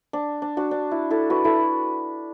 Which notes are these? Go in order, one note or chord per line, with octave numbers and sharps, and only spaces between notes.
D4
D4
D4 F#4
D4
E4
E4 A4
F#4 B4
E4 A4